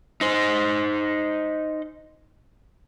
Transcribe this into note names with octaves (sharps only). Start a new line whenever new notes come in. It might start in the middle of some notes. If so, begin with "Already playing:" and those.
D#4 C5